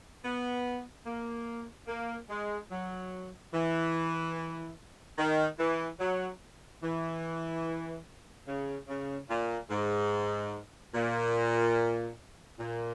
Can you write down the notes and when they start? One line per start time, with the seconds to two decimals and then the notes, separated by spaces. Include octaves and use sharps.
0.23 B3
1.05 A#3
1.87 A#3
2.29 G#3
2.71 F#3
3.53 E3
5.18 D#3
5.58 E3
6.00 F#3
6.82 E3
8.47 C#3
8.88 C#3
9.29 A#2
9.70 G#2
10.93 A#2
12.58 A#2